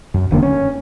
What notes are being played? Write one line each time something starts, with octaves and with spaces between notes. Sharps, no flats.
F#2
E1 D3 A#3
C#4